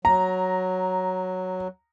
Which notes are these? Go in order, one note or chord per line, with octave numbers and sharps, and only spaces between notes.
F#3 A#5